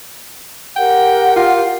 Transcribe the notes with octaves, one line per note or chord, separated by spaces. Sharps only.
G4 A#4 F#5 G5
F4